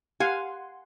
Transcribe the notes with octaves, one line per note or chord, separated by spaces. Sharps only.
G4 F5 F#5 G#5 C6